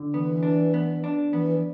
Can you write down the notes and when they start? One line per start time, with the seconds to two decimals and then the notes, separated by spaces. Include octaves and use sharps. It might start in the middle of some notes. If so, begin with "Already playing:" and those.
Already playing: D3
0.13 E3 B3
0.43 D4
0.74 B3
1.04 D4
1.33 E3 B3